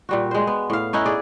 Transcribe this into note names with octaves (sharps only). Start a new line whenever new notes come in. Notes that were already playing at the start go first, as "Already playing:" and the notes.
A#2 G3 F#4
G#3 C5
B3
A2 F5
C#4 D#4 E4 F#5
G#4 D5